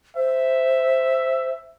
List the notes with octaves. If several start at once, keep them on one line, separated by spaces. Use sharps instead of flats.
C5 E5